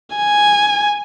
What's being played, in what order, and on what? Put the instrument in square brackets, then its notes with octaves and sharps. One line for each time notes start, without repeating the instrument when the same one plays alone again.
[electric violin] G#5